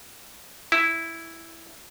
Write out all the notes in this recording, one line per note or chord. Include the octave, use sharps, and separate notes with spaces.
E4